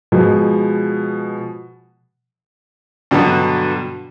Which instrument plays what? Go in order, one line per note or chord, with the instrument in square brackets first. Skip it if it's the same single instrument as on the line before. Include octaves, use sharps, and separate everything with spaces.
[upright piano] B2 F3 G#3
[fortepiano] G2 B2 D3 F#3